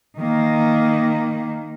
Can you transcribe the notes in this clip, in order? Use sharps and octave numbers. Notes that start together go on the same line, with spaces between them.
D#3 A#3